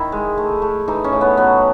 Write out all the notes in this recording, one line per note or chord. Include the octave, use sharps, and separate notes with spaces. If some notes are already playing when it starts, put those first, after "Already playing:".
Already playing: D#3 E4
G#3
A3
A3
E3 D#4
C#4
A2
B3
F#3 B3